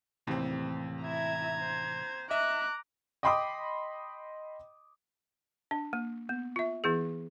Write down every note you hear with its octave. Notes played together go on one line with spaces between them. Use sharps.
D#2 A2 C3 E3 C4
E4 E5 A#5 G#6
C5
D#5 E5 A#5 D6 F#6
D#5 G5 B5 C6 D6 D#6
D4
A#3
B3
F4 E5
E3 B3 E4 G#4